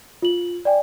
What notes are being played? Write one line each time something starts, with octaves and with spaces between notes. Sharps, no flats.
F4 F#7
D5 G5 G#5